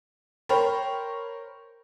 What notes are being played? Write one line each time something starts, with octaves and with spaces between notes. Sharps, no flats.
A#4 C5 C#5 G5 B5